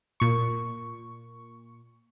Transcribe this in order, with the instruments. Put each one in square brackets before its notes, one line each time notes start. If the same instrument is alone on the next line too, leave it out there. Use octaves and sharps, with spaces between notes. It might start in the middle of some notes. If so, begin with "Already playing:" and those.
[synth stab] A#2 C#6